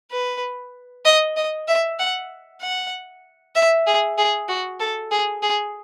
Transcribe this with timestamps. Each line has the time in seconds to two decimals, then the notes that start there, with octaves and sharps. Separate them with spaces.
0.12 B4
1.05 D#5
1.37 D#5
1.68 E5
1.99 F#5
2.61 F#5
3.55 E5
3.87 G#4
4.18 G#4
4.49 F#4
4.80 A4
5.11 G#4
5.43 G#4